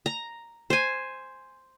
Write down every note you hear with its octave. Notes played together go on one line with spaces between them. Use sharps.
A#5
C5 G#5